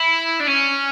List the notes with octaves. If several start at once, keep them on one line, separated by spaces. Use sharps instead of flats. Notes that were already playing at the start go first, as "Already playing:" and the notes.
Already playing: E4
D4
C#4